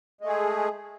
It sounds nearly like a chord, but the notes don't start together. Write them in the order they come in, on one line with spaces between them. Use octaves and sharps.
G#3 A3 G#4